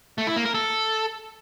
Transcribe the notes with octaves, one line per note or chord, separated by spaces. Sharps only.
A3
E4
A#3
A#4
A4